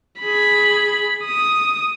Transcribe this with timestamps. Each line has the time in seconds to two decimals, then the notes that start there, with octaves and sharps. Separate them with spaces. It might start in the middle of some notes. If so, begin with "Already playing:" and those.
0.21 G#4 B5
1.25 D#6